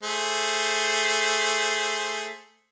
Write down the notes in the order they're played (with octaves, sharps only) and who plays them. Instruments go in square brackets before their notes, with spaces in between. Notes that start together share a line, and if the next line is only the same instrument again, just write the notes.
[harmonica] A3 G#4 C5